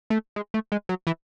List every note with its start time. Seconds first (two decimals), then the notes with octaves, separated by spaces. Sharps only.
0.10 A3
0.36 G#3
0.54 A3
0.72 G#3
0.89 F#3
1.07 E3